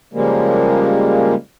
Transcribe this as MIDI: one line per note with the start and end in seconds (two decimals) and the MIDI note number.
0.14 1.35 49
0.14 1.35 53
0.14 1.35 55
0.14 1.35 56
0.14 1.35 58